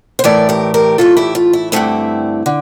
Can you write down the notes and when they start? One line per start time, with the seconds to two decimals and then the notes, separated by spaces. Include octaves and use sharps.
0.19 C5
0.24 A2 E3 A3 A#4 D5
0.49 G4 A#4
0.74 G4 A#4
0.98 A2 E3 A3 F4 A4
1.17 E4 G4
1.35 F4
1.53 E4
1.72 G2 D3 A3 C4 E4
2.46 D3